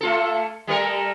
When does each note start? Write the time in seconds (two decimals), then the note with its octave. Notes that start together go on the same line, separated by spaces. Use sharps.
0.01 A3 F4 A4
0.67 G3 A3 A#4